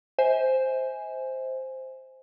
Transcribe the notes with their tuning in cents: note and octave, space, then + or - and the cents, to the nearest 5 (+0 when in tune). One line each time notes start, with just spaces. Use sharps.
C5 +0 E5 -45 G#5 +0